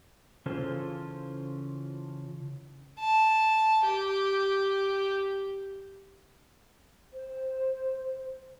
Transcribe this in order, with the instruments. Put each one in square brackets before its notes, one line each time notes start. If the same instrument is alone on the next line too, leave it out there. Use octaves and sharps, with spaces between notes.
[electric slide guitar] C#3 E3 C#4 F4 A4 C5
[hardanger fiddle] A5
G4
[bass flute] C5